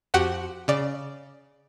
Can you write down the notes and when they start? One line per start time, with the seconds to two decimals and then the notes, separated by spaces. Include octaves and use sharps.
0.14 F2 F#4 G4 F#5
0.68 C#3 D5